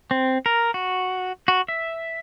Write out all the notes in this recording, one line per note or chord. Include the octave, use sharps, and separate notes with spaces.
C4
A#4
F#4
F#4
E5